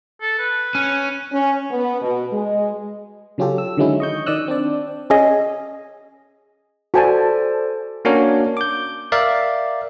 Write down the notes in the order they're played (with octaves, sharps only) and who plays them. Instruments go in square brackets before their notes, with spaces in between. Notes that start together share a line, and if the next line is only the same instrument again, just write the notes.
[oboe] A4
B4
[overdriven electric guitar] C#4
[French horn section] C#4
B3
B2
G#3
[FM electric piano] C#3 F#3 C#4 F4 G4 A4
E6
D3 D#3 F#3 G#3 C#4 E4
D#5 C#6 G6
D#3 D5 D#5 D#6 E6 F#6
C4 D4 D5
[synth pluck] C#4 G#4 D#5
[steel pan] F#4 G#5 A5 [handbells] A4 C5 D5
[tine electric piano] A#3 C#4 D4 F#4 A#4 C#5
D6 G6
A#4 D5 E5 F5